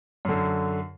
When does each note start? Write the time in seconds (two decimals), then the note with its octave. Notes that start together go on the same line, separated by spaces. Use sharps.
0.25 F#2 D3